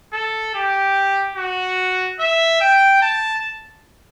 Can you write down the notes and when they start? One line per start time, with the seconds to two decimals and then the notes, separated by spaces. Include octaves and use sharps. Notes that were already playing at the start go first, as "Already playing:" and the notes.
0.13 A4
0.54 G4
1.36 F#4
2.19 E5
2.61 G5
3.02 A5